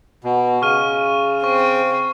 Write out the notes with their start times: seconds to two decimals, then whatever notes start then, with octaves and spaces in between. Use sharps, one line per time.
0.24 B2
0.62 C#3 C#6 F6 D#7
1.44 C4 C#6